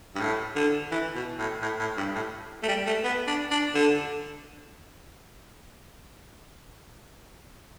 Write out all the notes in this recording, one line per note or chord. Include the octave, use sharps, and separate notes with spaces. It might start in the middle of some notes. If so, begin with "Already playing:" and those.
G2
A2
D3
E3
B2
A2
A2
A2
G2
A2
A3
G3
A3
B3
D4
D4
D3